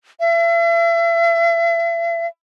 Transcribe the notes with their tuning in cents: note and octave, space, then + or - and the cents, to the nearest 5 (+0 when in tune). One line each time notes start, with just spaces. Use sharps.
E5 +40